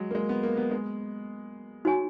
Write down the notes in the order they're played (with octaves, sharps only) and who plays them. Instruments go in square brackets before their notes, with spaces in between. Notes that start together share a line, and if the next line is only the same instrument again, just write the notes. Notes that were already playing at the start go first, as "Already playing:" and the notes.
Already playing: [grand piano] F#3 G#3
A#3
G#3
B3
A#3
B3
G#3
[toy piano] D#4 F#4 C#5 G#5 C#6